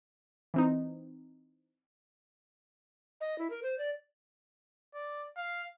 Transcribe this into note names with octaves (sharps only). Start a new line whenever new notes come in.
E3 C4 D#4
D#5
E4
A#4
C5
D5
D5
F5